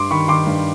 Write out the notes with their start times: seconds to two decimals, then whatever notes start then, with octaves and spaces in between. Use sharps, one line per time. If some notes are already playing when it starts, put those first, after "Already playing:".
Already playing: G2 C6 D6
0.11 D#3 B5 C#6
0.28 D#3 C6 D6
0.47 G2